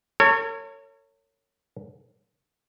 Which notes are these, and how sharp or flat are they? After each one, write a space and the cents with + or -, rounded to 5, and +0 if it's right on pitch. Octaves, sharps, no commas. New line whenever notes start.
A#4 -45 C#5 +0